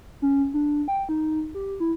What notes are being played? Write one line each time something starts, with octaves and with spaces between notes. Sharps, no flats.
C#4
D4
G5
D#4
G4
E4